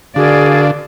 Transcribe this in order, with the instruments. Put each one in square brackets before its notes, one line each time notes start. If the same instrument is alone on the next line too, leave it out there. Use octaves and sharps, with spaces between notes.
[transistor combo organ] D3 [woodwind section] F#4 A#4 F5 [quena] G#4 [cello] D5